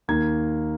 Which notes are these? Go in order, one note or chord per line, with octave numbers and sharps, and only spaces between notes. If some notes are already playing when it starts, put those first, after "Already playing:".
D#2 D#3 A#3 G#6